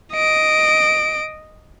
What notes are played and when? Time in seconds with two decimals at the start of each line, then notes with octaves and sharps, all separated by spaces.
0.13 D#5 D7